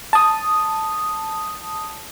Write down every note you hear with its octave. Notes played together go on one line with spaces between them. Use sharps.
A5 D#6